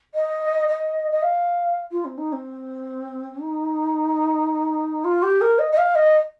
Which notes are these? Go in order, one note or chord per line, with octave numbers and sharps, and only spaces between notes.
D#5
D#5
D#5
F5
F4
C4
D#4
C4
D#4
F4
G4
A#4
D#5
D#5
F5
D#5